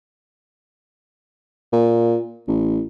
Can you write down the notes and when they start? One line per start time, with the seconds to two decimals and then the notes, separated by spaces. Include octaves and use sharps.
1.73 A#2
2.48 A1